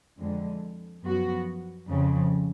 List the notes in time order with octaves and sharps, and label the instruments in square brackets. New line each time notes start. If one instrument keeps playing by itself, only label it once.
[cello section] F2 D3 G#3
F#2 F3 B3 F#4
F2 C#3 F3